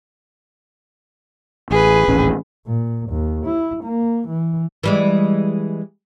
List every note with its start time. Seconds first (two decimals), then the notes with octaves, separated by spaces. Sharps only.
1.71 A1 G#4 B4
2.08 D#1 A1 C#4
2.66 A#2
3.09 D#2
3.46 E4
3.83 A#3
4.28 E3
4.83 E3 G3 G#3